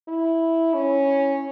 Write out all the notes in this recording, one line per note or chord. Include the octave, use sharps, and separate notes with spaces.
E4
C#4